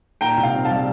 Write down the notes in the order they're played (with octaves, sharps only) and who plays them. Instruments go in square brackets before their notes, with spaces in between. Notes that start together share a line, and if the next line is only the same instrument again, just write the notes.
[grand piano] A#2 G5 A#5
C2
F5
C4
F5 A5
G3